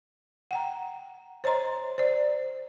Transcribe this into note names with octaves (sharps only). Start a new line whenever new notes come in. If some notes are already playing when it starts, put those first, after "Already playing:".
F#5 G5 A#5
C5 C#5 D#5 A#5 C6
C5 D5